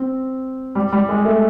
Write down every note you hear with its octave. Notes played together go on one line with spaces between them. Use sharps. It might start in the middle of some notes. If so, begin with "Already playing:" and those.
Already playing: C4
G3
G3
G#3
A3